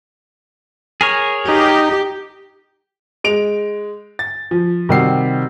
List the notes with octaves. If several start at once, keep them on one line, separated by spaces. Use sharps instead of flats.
G#4 A#4 C#5
D#4 G4
G#3 D7 F7
A6
F3
C3 D#3 G3 F#4 C7